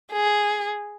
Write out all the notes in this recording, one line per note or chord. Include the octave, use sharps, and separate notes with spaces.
G#4